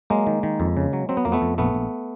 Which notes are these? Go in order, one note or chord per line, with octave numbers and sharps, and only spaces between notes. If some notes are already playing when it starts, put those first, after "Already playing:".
F#3 G#3 A#3
D#3
D#3
F2
C#3
F#3
F#3 C4
B3
F2 A#3
A3 B3
F2
A#1 A3 B3
A#1